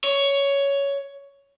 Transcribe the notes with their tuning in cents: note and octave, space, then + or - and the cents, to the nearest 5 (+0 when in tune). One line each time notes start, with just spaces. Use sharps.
C#5 +10